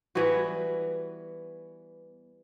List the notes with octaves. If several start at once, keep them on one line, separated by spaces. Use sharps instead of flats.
E3 G3 B3 F#4